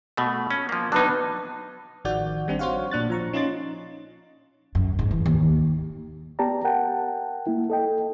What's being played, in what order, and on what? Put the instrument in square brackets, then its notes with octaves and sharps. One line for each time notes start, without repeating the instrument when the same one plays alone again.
[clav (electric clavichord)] B2 A3
C#4
F3 A#3
[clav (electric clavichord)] F#3 D#4 [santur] B3 D4
[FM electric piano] A1 D#3 F3 F#4 D5 G6
G3 C4 D4
F#4 C5 C#5 F5 F#5
A#2 D4 F#6 A6
F3 A#5 C#6
C#4 D#4 F4 D#5 C6 A6
[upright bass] F#2
G#2
E3
D#2
[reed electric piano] B3 G4 D5 G5 A5 A#5
A#4 F#5 G5 A5
A#3 E4
A4 D#5 G5